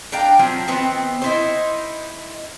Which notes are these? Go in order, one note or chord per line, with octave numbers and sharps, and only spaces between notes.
D4 F5 G5 A#5
F3 F#3 C4
D#3 B3 C4
D#4 E4 C5